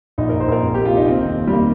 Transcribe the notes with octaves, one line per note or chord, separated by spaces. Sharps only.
A#1 D#4
A#4
A#2
C5
A#1 A#4
C3
G4
F2
F4
F1 D#4
D#2 C4
D#3
D#2
G3
D#3 A#3